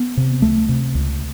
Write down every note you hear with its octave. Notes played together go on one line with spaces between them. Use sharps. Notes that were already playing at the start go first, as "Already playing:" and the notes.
Already playing: B3
C3
C#2 A3
C3
C#2